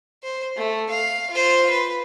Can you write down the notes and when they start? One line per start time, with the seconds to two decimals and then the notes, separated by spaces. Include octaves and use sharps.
0.23 C5
0.56 A3
0.90 F5
1.30 F4 C5
1.70 B4